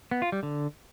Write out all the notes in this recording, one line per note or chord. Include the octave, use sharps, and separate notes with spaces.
B3
F4
G3
D3